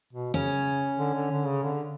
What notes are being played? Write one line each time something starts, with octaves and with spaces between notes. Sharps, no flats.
B2
C#3 C#4
D3
D3
D3
C#3
D3